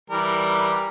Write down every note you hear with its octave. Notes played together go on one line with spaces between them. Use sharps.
E3 G3 A#4